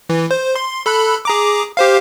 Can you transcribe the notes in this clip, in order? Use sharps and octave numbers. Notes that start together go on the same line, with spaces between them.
E3
C5
C6
A4 B5 F#6
G#4 A#5 D6
G4 C5 F5